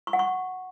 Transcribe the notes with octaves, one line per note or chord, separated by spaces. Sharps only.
C#6
F#5
C#6